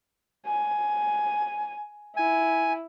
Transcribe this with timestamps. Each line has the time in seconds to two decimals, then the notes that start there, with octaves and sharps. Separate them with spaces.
0.47 G#5
2.17 E4 G#5